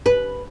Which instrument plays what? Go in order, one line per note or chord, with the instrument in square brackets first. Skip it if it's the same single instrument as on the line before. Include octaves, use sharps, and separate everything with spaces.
[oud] B4